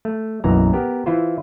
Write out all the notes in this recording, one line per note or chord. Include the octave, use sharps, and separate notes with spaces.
A3
B1 F#2 E3 A#3 A#5
B3 G4 A#4
E3 E4 F4 C5